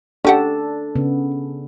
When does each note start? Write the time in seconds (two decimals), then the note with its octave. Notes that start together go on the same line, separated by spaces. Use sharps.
0.25 C#4 D4 G4 A4 F#5
0.96 C#3 B3